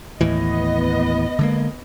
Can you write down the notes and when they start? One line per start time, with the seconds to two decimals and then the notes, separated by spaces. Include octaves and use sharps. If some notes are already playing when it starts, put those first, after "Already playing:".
0.21 D#2 A2 E3 B3 D#5
1.39 D3 G#3 A#3